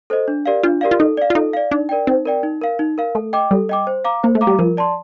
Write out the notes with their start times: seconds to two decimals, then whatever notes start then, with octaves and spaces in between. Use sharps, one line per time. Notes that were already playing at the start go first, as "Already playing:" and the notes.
0.10 A4 C5 D#5
0.28 D4
0.46 G4 A#4 D5 F5
0.63 D4 F4
0.81 G4 A#4 D5 F5
0.91 F4
0.99 D#4 A4
1.17 D5 F5
1.30 F4
1.35 D#4 A4
1.53 D5 F5
1.71 D4 D#4
1.89 A#4 D5 G5
2.07 C4 D#4
2.26 A#4 D5 G5
2.43 D#4
2.62 A#4 F5
2.79 D#4
2.98 A#4 F5
3.15 A3 A4
3.33 D#5 G5 D6
3.51 G3 A4
3.69 D#5 G5 D6
3.87 C5
4.05 F5 A#5 D6
4.23 A#3 C5
4.35 A3
4.41 F5 A#5 D6
4.47 G3
4.59 F3 A#4
4.77 D5 A5 C6